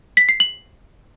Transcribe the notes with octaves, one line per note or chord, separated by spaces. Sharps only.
B6
C7
F#7